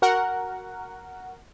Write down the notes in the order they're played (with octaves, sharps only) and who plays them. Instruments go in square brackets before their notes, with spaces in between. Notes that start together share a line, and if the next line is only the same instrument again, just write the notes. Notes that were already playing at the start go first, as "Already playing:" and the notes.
[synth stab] F#4 A#4 F#5